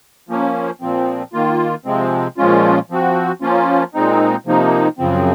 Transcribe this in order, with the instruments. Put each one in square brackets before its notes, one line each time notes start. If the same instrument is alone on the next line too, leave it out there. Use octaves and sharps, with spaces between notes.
[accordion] F3 A#3 C#4
A#2 F3 C4
D#3 A#3 F4
C3 F3 G#3 C4
A#2 F3 G#3 C#4 F4
F3 C4 F#4
F3 A#3 C#4 F4
A#2 G#3 C4 D#4
C3 F3 A#3 D#4
F#2 C#3 F3 C4